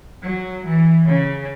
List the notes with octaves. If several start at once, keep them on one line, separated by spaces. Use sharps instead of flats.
F#3
E3
C#3